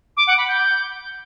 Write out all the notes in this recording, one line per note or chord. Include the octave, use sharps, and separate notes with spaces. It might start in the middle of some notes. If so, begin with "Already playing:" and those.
D6
F#5
B5
G6